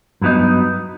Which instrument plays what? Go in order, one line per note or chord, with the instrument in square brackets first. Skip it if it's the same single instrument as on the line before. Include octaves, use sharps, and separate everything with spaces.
[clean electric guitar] G2 F#3 B3 D#4